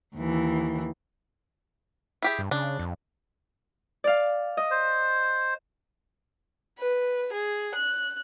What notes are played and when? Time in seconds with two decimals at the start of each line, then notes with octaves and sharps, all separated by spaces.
0.15 D#2 E3
2.22 E4 G4 G#4
2.39 G2
2.51 C#3 D4
2.79 F2
4.04 D5 F5
4.57 D#5
4.71 C5
6.79 B4
7.33 G#4
7.75 F#6